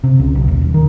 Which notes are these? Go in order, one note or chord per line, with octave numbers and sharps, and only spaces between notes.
C3
C#2
B1
D#1
D#1
D#3